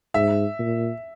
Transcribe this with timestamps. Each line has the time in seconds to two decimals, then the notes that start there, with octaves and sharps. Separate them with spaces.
0.14 G#2 E5
0.59 A#2